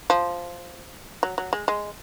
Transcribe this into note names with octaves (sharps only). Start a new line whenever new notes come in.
F3
F#3
F#3
G#3
G#3